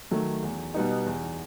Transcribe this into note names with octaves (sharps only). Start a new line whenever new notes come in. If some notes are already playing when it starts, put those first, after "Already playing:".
D#3 F#3 A3
E2
B2 G3 B3 D#4
E2